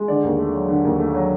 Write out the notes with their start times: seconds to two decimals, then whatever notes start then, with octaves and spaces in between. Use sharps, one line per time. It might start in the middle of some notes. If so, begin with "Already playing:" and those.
Already playing: G#3
0.08 D3 D5
0.24 D#2
0.39 A3
0.54 F#3
0.69 D3
0.84 D#2
0.99 A3
1.14 F#3